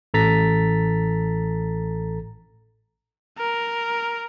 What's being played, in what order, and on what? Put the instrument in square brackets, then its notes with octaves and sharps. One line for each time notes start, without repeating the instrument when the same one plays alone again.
[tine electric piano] A1 A4 A#5 A6 B6
[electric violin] A#4